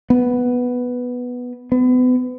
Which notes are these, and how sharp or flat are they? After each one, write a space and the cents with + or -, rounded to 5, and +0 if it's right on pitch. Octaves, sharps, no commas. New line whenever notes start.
B3 +0
B3 +35